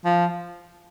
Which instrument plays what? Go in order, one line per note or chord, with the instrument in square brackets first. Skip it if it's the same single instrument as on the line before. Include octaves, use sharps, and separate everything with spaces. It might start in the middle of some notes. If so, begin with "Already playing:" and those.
[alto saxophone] F3